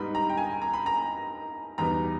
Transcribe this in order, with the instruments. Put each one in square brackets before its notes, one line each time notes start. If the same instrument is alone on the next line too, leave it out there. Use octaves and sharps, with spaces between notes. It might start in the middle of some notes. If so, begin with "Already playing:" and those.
Already playing: [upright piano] G#2 G3 B3 D#4 B5
A#5
G5
G#5
A#5
B5
A#5
E2 B2 G3 B3 D#4 A#5